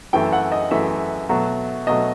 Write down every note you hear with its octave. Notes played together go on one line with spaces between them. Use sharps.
F#2 E3 A3 G5
F#5
D#5
F#2 E3 A3 E5
B2 F#3 A3
B2 F#3 A3 D#5